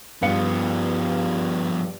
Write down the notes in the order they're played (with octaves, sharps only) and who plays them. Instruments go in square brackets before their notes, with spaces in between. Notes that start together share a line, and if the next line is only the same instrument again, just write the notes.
[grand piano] G2 F5 C#7 [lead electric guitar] F3 B3